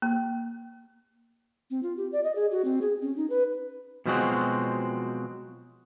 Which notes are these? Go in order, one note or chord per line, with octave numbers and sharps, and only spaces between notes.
A#3
C4
F4
G4
D5
D#5
G#4
F#4
C4
G#4
C#4
D#4
B4
B2 F3 F#3 G#3 C4 F#4